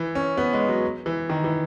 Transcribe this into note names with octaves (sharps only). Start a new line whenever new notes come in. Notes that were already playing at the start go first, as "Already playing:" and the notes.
Already playing: E3
C#4
B3
G#3
F#3
E3
D#3
E3